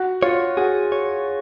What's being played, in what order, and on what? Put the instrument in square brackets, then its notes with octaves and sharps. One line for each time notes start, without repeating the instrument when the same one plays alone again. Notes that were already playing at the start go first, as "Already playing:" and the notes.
Already playing: [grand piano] F#4
[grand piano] F4 [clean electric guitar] C#5
[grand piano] F#4 [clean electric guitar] G#4
[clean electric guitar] C#5